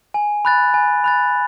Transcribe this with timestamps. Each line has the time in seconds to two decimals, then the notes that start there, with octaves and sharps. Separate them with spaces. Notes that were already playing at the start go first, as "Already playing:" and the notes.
0.14 G#5
0.45 B5 F#6 A6
0.74 G#5
1.04 B5 F#6 A6